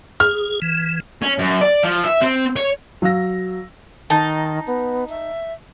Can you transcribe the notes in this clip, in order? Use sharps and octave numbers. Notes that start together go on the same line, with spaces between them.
G#4 F6
E3
C#4
F#2
D5
F3
E5
C4
C#5
F#3 F5 E6 A#6
D#3 D#4 A5
B3
E5